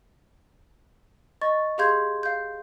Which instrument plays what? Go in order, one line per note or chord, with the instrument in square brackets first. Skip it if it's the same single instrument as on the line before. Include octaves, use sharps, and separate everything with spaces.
[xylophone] D#5 C#6 A6
G4 G#4 F5 C6 G6 G#6
F5 G6